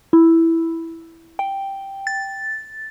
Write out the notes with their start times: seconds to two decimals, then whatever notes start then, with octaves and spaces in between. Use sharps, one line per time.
0.13 E4
1.39 G5
2.07 A6